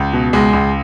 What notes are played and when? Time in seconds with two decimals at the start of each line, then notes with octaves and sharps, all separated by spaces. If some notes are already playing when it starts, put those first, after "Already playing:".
Already playing: C#2
0.13 B2
0.33 C#2 G#3
0.53 C#2